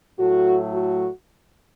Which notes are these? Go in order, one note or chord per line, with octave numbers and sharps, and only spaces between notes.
A2 F#3 A3 F#4
F#4